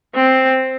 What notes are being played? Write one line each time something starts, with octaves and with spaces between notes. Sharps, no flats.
C4